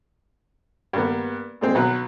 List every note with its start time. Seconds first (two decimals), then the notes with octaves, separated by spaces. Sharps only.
0.93 G2 A#3 B3
1.61 A#2 G#3 C4
1.75 B1 F#3 B4